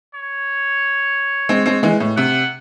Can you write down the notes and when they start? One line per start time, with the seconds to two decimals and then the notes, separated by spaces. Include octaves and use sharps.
0.14 C#5
1.49 G#3 C4
1.66 G#3 C4
1.83 E3 G#3
2.00 A2
2.17 C3 F#5